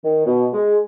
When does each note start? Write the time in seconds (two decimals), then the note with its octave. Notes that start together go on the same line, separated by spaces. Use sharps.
0.04 D#3
0.26 B2
0.53 G#3